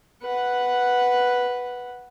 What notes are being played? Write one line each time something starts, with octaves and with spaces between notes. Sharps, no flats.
B4 F#5